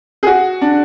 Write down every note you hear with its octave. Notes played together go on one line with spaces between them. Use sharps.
G#4
F#4
D4